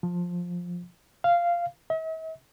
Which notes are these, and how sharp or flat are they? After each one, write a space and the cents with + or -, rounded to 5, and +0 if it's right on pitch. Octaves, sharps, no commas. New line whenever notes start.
F3 +10
F5 -10
E5 -45